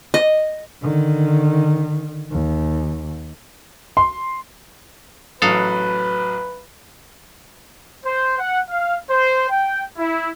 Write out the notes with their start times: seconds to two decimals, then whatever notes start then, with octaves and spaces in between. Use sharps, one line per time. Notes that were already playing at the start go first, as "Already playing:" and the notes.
0.14 D#5
0.82 D3 D#3
2.31 D#2
3.97 C6
5.42 A1 F#3 A4 B4 F5 D#6
8.05 C5
8.39 F#5
8.70 F5
9.10 C5
9.50 G5
9.98 E4